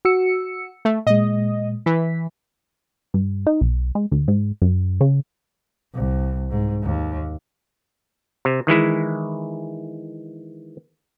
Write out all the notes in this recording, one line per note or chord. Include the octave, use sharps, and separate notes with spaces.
F#4 E6 C#7
A3
A#2 G#3 D#5
E3 B6
G2
D#4
B1
G#3
D2
G#2
F#2
C#3
C2
G#2
D#2
C3
D#3 E3 G#3 E4